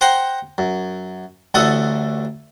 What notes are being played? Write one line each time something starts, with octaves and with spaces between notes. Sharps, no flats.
C5 F#5 G5 A#5 C6
F#2
A1 D2 A3 A4 F#5 D#6